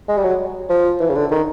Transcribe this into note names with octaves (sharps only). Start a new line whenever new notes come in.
G#3
G3
F#3
F3
E3
C#3
D3
D#3